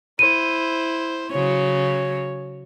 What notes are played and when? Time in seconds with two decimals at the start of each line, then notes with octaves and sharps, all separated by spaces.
0.19 E4 C5 D#7
1.32 C#3 F#3 C#5